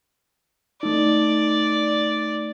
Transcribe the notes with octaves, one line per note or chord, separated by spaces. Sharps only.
A3 D#4 D5